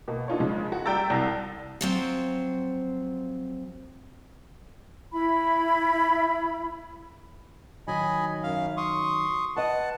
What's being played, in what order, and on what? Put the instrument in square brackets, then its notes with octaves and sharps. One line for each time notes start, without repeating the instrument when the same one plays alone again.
[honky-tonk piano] B2 A#3
D4 D#4 F4 C#5
C#3 F3 G#3
F#4
G3 F#4 G5 A#5 E6 A6
C2 A5 A#6
[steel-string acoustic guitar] F3 F#3 C4
[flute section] E4 B5
[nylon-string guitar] D#3 F#3 [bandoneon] D#5 G#5 B5
[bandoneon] F#2 F5
C6 C#6 D#6
[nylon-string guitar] B4 D#5 [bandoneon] F#5 A5